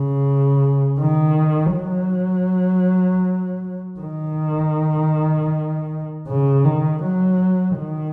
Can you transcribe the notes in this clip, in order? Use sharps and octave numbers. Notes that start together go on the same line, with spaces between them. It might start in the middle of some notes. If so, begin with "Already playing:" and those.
Already playing: C#3
D#3
F#3
D#3
C#3
D#3
F#3
D#3